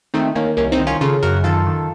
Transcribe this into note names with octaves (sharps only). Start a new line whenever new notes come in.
D#3 A3 C4
D#3 A#3 C#4
C2 A#3 C#4
C4 D#4
D#3
C#4 F4
C#3 F4 A4
F#2 F#4 A#4
D#3 F4 A4
D#3